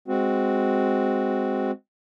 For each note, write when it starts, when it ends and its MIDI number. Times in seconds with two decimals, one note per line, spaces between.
0.08 1.71 56
0.08 1.71 60
0.08 1.71 66